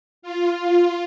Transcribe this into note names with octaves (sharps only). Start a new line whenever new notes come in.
F4